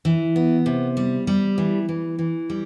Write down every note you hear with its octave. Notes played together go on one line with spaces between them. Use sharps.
E3
B3
C3
G3
G3
E3
E3
E3
G3